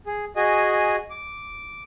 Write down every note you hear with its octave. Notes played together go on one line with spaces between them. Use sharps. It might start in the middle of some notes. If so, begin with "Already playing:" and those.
G#4
F#4 G#4 D#5 G#5
D6